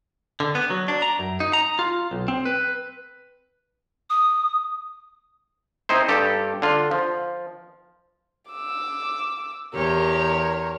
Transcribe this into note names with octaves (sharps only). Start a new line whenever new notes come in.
D3
B3
F#3
D4
A#5
F#2
D#4
A#5
F4
B1
C4
B4
D#6
C4 D#4 E4 C5
G2 G4 A4
D3 F4
F3
D6 E6
E2 G4 A#4 C#5